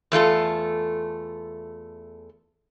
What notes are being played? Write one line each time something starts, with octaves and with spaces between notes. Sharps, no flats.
E2 A3 F4 A4